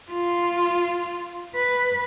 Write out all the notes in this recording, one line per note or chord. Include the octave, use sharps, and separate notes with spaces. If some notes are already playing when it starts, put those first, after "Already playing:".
F4
B4